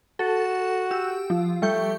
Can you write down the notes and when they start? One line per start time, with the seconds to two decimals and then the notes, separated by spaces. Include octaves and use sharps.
0.19 F#4 A4
0.91 G4 E6
1.30 F3
1.62 G3 A3 C#6 G6